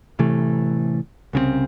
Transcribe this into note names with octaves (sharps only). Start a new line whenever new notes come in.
A1 C3 E3 A3
C2 C#3 E3 C4